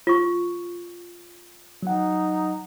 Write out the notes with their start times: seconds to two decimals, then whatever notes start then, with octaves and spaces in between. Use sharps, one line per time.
0.07 F4 C#6
1.83 F#3 D#4 F#5